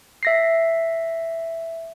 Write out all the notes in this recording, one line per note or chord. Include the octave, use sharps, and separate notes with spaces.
E5 A#6 C7